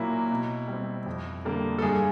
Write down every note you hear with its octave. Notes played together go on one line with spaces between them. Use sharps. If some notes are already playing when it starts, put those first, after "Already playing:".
Already playing: A#2 F#3 A#3 E4
B2
G3
C4
F2
D3 G3 A#3
A4
G2 G#4